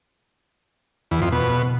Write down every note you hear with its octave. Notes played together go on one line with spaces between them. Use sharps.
E2
F2
B2